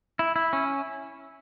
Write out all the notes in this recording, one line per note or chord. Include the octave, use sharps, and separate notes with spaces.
E4
E4
C#4